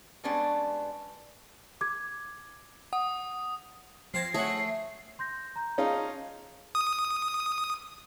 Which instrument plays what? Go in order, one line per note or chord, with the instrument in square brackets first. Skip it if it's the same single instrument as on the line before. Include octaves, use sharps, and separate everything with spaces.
[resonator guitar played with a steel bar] G3 G#3 B3 C#4 D4
[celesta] D6 G#6
[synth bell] F#5 [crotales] D#6
[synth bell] F3 G#6 A#6 [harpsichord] C4 C5 A5 [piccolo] C7
[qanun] A3 [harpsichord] G#4 F#5 [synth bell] C#5 E5
[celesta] C6 G6 A#6
A#5 G6
[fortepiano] C#4 D#4 F4 [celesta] G#4 A5 A#5
[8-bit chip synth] D#6